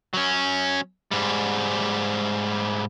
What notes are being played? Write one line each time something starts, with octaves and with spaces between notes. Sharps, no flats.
F#3 C#4
G#2 G3